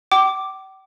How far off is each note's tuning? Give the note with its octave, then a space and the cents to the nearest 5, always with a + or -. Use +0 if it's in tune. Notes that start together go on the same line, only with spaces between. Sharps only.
G5 -40 D6 +5